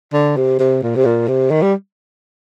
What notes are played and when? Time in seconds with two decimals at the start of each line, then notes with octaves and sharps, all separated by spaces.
0.13 D3
0.36 C3
0.59 C3
0.82 A#2
0.96 C3
1.05 A#2
1.28 C3
1.51 D#3
1.62 G3